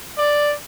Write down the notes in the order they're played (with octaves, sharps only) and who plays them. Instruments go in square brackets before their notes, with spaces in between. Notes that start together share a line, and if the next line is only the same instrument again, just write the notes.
[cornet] D5